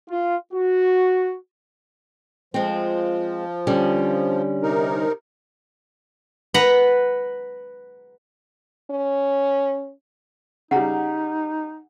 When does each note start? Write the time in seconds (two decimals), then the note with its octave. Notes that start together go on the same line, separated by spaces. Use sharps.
0.10 F4
0.53 F#4
2.54 F3 G#3 C4
3.67 D3 G3 C#4
4.63 C3 D#4 A#4
6.54 B4 F#5 A#5
8.91 C#4
10.71 C#3 G3 D#4 F#5 A#5